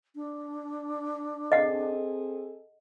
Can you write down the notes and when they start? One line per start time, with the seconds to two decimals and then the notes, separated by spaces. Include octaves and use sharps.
0.15 D4
1.52 C4 G#4 A4 D#5 F#5